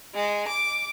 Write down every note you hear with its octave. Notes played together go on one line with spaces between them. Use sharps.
G#3
D6